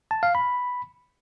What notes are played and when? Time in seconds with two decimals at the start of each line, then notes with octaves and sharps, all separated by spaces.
0.11 A5
0.23 F5
0.35 B5